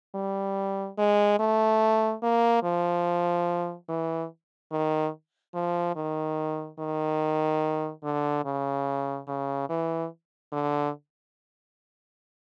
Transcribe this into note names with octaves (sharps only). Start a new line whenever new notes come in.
G3
G#3
A3
A#3
F3
E3
D#3
F3
D#3
D#3
D3
C#3
C#3
E3
D3